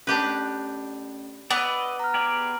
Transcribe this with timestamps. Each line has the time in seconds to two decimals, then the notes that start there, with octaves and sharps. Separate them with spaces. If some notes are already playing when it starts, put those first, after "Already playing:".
0.07 A3 C#4 D4 G4 B4
1.51 B3 D5 D#5 D#6 E6
1.99 A#5 F6
2.14 G4 G#4 D5